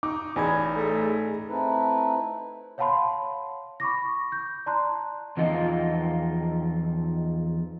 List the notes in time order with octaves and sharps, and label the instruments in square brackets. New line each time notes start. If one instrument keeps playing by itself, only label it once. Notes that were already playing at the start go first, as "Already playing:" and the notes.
[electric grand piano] D#4 [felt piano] D6
[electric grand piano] A1 D#4 G#6 [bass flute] G#4 [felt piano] D5 G#5 B5
[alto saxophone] A3
[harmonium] A3 C4 D#4 E4 B4
[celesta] C#5 F5 F#5 A5 B5 C6
B5 C#6 D6 A#6
G6
D5 A5 A#5 C6 F#6
[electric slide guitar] E2 F3 D#4 F4 D#5 F5